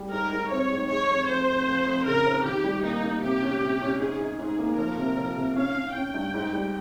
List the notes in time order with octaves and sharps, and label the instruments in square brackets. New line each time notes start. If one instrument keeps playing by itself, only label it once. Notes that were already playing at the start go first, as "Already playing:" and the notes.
Already playing: [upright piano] G3
[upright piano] G#2 [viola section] A#4
[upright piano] G#2
[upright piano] C4 [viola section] C#5
[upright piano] G#2
[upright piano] G#3 [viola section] C#5
[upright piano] F2
[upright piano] F2 [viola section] C5
[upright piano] F2
F2
F2
[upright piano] C#3 [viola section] A#4
[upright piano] C4
[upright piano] D#3 [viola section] G4
[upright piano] G3
[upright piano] A#3 [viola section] D#4
[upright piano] A#3
[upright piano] C3 [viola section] G4
[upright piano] C#4
C3
C#4
[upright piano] G#2 [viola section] G#4
[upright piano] D#4
[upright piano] G#2 [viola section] G#4
[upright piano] A#3
[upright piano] F3 [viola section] A#4
[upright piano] C3
F3
C3
[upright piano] C#4 [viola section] F5
[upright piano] C#4
[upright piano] C#4 [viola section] G5
[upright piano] G2
G#2
G3